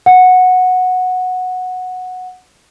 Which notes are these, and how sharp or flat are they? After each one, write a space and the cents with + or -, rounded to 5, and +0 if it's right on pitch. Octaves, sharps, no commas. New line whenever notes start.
F#5 -10